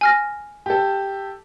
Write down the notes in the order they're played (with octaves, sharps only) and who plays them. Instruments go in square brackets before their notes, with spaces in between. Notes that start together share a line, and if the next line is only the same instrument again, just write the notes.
[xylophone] G#5 F6 A#6
[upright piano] G4 A4